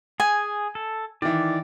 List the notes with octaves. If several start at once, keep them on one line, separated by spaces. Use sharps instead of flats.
G#4 G#5
A4
D#3 E3 D5